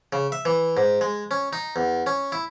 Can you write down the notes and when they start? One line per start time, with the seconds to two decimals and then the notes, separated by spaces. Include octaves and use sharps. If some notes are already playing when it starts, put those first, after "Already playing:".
0.13 C#3
0.32 E5
0.45 E3
0.77 G#2
1.01 G#3
1.31 C#4
1.53 D#4
1.76 E2
2.06 C#4
2.32 E4